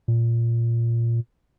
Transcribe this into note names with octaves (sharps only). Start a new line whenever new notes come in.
A#2